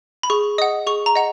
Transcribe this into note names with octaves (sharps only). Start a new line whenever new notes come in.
B5
G#4 C#6
D#5 F#5 D#6
G#4 C#6
A#5
D#5 F#5